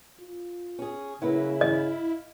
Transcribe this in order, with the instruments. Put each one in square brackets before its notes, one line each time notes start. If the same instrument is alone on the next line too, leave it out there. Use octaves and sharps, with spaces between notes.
[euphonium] F4
[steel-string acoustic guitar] C#4 G#4
[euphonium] C#3 [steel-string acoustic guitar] F#3 A#3 B4 [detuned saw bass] E4
[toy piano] D#5 [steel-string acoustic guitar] F5